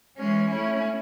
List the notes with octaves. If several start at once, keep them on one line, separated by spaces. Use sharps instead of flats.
E3 G#3 C#4
A3 C#4 E4